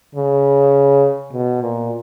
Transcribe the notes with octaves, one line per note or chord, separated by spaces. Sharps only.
C#3
B2
A#2